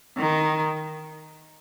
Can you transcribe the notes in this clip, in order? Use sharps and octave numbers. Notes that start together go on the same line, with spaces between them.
D#3